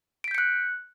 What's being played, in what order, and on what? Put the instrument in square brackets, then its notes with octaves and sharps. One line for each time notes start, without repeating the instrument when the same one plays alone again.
[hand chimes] D7
B6
G6
C#7
F#6